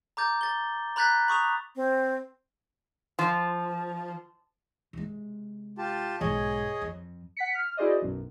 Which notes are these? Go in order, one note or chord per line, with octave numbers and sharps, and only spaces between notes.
A#5 D6 G6 A6
A6 G7
A#5 B5 F#6 G6 A6 B6
B5 C#6 D#6 F7
C4
F3
C3 G#3
F4 G4 A5
B1 G#2 G#4 C#5 D#5
F2
F#5 B6 C#7
F6
E4 F#4 G#4 C5 D5 D#5
B1 F#2